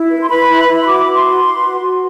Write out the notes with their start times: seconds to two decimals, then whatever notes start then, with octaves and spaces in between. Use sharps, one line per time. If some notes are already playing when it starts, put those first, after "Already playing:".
Already playing: E4
0.11 B4
0.22 C6
0.29 B4 B5
0.49 E4
0.68 E4
0.81 C6
0.86 F#4 D6
1.05 F#4
1.15 C6
1.24 B4
1.43 B4
1.62 F#4
1.81 F#4